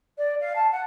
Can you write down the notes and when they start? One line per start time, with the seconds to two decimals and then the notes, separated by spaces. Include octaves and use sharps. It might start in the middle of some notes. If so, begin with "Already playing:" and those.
0.17 D5
0.39 F5
0.55 A5
0.72 F#5